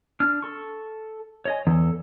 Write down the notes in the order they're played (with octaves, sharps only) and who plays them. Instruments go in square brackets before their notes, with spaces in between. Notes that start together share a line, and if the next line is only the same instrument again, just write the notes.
[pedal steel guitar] D4 F6
A4 C#6
C#5 D#5 G#5
[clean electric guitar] E2 [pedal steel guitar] A4